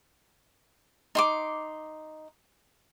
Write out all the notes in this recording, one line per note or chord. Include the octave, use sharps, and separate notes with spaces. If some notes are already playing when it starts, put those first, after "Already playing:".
D#4 C6 D6